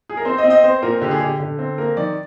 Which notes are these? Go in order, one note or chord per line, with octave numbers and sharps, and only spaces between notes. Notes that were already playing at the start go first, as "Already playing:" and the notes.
G#4
A#4
C4 C5
D#5
C4
D#5
C4 C5
A#2 A#4
D3 G4
G#4
D3 G4
D3
C4
A#3 A#4
D#3 D5